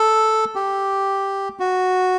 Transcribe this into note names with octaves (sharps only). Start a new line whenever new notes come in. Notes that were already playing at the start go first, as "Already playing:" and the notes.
Already playing: A4
G4
F#4